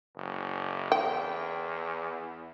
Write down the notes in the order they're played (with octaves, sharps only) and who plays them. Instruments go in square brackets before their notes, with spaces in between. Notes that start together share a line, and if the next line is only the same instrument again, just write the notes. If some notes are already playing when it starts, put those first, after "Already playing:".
[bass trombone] F#1
[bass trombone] E2 [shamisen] G5